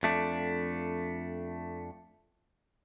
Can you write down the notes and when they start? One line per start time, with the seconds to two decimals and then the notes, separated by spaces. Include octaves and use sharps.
0.03 F2 A3 D4